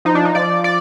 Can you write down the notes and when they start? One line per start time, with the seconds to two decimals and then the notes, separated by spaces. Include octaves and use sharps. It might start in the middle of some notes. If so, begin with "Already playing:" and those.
0.05 F3 D#4
0.15 D4
0.25 D#4
0.35 F3 D5
0.64 D5